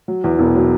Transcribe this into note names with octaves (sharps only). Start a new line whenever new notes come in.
F#3
E2
E1
F#3